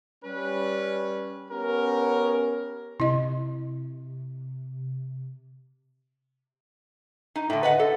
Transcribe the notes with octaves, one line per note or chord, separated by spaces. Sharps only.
G3 C#4 B4
B3 C#4 G4 A#4
C3 E4 D#5
D#4
A2 D3
B4 D#5 F#5
A4